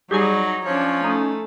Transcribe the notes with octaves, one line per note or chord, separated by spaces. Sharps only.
F#3 G3 D#4 G4 G#4 G#5
F3 C#4 D4 C#5
A3 C#4 D#4